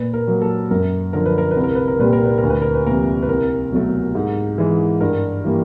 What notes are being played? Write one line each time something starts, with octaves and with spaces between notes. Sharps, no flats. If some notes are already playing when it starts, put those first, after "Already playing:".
Already playing: A#2 B4
A#4
F#3 A#3
A4
F#2 A#4
D3 F3 A#4
B4
A#4
B4
C2
A#4
B4
A#4
A#2 G3 B4
A#4
B4
A#4
D2
B4
A#4
B4
C3 F3 A#3 A#4
B4
C2 A#4
B2 F#3 A3
G#2
E3 G#3
G2 A#4
E3 G3 A#3